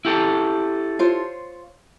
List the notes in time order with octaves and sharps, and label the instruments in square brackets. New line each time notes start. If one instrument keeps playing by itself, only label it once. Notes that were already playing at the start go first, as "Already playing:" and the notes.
[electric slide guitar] E4 G4 A4
[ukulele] F4 C5 C#5